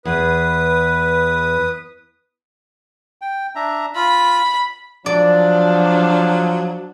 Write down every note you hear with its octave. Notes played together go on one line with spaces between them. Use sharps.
E2 B4 D#6
G5
D4 E5 A#5
F4 B5
F3 F#3 D4 D5